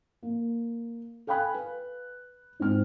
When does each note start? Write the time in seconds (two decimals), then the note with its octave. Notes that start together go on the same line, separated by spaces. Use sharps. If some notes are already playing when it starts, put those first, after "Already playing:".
0.23 A#3
1.27 A4 F5 G5 G#5 B5 F#6
1.54 B4
2.60 G#2 C4 F6